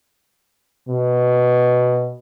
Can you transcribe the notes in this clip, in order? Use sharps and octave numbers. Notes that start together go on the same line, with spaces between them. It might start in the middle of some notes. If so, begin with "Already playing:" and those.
B2